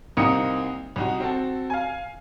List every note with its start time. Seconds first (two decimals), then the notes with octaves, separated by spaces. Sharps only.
0.17 C2 A#3 C4 D#4 D#6 C#7
0.96 C2 D#4 F#4
1.20 C4 F#4 A4
1.70 F5 G#5